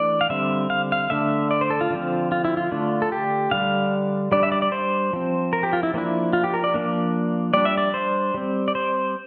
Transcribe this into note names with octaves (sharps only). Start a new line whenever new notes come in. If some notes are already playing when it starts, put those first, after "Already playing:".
Already playing: E3 A3 D4 D5
F5
D3 G3 C4 E5
F5
F5
D3 A3 D4 E5
D5
C5
A4
F4
D3 F3 C4
F4
E4
F4
D3 A3 D4
A4
G4
D3 G3 D4 F5
G3 D4 D5
E5
D5
D5
C5
F3 C4
A#4
G4
F4
E4
F3 A#3 D4 E4
F4
G4
A#4
D5
F3 A#3 D4
G3 D4 D5
E5
D5
C5
G3 C4
D5
C5